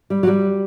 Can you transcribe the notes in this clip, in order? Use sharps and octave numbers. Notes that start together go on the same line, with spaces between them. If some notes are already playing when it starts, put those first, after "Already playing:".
G3
F#3
G3